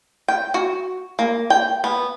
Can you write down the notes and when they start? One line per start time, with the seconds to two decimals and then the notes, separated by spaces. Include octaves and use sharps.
0.28 G5
0.54 F#4
1.19 A#3
1.50 G5
1.84 B3